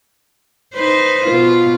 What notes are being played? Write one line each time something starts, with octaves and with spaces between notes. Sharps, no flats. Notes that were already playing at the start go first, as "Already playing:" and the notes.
D#4 B4 C5
B2 F4